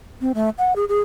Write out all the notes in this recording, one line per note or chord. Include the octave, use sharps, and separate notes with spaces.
C4
A3
F#5
G#4
G#4